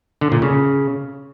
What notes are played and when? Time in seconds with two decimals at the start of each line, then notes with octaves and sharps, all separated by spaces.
0.21 D3
0.32 A#2
0.42 C#3